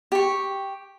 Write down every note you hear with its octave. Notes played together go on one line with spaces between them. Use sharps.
G4 C#6